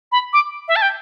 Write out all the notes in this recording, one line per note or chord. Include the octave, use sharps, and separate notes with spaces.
B5
D6
E5
A5
G5